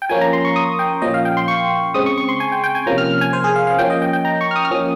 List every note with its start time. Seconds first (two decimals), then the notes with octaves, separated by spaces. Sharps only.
0.02 G5
0.09 F3 A#3 C#4 G#5
0.21 A#5
0.33 C6
0.45 C#6
0.56 D#6
0.79 G5
1.02 A#2 F3 A#3 C#4 D#5
1.14 F5
1.25 G5
1.37 C6
1.48 C#6
1.94 C#3 G#3 C4 D#6
2.06 C#6
2.18 C#6
2.28 C6
2.40 G#5
2.52 G5
2.64 G5
2.75 G#5
2.86 C3 F3 A#3 C#4 A#5
2.98 F6
3.21 G#5
3.33 C5
3.44 G#4
3.56 F5
3.67 F5
3.78 F3 A#3 C#4 G5
3.90 D#5
4.02 G5
4.13 G5
4.25 A#5
4.41 C#6
4.51 F6
4.56 D#6
4.65 F6
4.71 F3 A#3 C#4 D#6